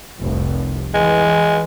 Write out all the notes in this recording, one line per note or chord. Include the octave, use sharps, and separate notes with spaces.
F1 C2
E3 G#3